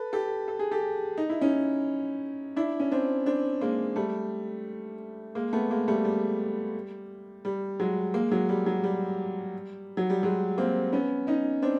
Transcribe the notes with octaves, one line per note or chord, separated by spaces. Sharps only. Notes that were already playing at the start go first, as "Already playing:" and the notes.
Already playing: A4 B4
G4 A4
A4
G#4
G4 A4
D#4
E4
C#4 D#4
D4 E4
C#4
C4 D4
C4 D4
G#3 A#3
G3 A3
G#3 A#3
A3 B3
G#3 A#3
G3 A3
G3
G3
F#3 G#3
G#3 A#3
F#3 G#3
G3
F#3
G3
F#3
G3
F#3 G#3
A#3 C4
B3 C#4
C#4 D#4
C4 D4